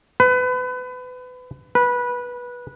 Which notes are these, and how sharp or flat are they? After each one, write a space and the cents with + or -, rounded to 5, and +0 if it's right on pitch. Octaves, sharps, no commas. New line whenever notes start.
B4 +30
B4 -15